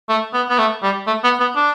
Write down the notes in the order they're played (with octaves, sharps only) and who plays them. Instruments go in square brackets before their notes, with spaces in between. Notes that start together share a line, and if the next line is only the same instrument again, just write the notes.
[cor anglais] A3
B3
B3
A3
G3
A3
B3
B3
D4